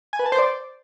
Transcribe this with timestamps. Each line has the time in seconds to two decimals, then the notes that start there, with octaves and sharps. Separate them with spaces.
0.13 G#5
0.19 B4
0.26 A5
0.32 C5
0.38 D5